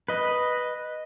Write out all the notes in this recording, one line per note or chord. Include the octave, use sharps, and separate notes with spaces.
B4 D#5